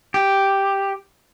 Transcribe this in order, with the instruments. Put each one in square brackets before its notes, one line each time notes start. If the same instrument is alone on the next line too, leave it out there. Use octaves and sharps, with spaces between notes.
[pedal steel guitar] G4